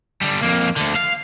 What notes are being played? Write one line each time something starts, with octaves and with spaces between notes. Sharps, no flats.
D3 G3
F2 A#3
D2 D3
F5